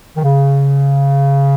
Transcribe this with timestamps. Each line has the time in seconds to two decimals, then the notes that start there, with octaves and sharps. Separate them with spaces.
0.16 D#3
0.23 C#3